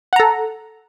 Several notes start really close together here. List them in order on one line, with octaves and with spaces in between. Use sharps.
F#5 A#5 A4